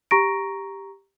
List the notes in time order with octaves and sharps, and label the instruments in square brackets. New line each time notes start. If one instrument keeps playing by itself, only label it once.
[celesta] G4 A#5 C#6 A#6 D7